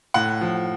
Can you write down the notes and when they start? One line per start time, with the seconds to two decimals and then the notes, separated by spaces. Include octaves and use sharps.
0.14 A2 F#5
0.41 F3